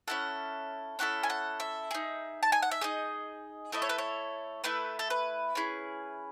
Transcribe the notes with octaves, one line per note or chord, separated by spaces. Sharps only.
C#4 E4 A4 F#5
C#4 E4 A4 F#5
G#5
F#5
E5
D#4 G#4
A5
G#5
F#5
E5
D#4 G#4 D#5
A3 E4 A4 D#5
C#5
B4
C#5
A3 E4 A4 B4
A4
B4
C#4 E4 G#4